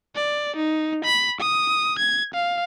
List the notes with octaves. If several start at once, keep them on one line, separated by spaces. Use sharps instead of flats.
D5
D#4
B5
D#6
G#6
F5